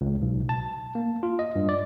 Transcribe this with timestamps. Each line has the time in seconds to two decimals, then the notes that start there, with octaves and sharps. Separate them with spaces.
0.01 C#2
0.22 B1
0.49 A5
0.95 A#3
1.23 F4
1.39 D#5
1.56 G2
1.69 D5